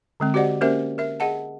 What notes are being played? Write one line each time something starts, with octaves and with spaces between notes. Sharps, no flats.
D3 G#3 C4
F#4 G4 C5 D5 D#5 F#5
A#3 C#4 G4 A#4 C5 E5
A#4 E5
G#4 D#5 F#5 A5